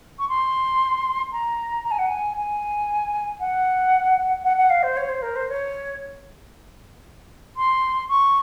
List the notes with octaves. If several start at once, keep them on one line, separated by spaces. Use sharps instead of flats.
C#6
C6
A#5
A#5
G#5
F#5
G#5
G#5
F#5
F#5
F#5
F5
C5
C#5
C5
A#4
C5
C#5
C6
C#6